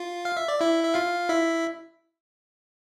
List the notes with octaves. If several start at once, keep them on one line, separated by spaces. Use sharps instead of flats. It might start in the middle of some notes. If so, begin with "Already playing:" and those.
Already playing: F4
F5
E5
D5
E4 E5
E5
F4 F5
E4 E5